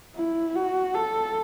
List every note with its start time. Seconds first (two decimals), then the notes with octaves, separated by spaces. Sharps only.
0.15 E4
0.55 F#4
0.94 A4